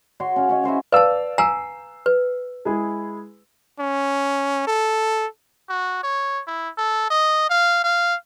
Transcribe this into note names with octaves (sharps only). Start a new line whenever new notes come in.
F#4 C#5 C6
C#4 F5
C#4 C#5 D#5
E4 F#4 C5 G#5
B4 D5 F5 A5 E6
F5 G#5 A#5 E6 C7
B4
G#3 E4 G#4
C#4
A4
F#4
C#5
E4
A4
D#5
F5
F5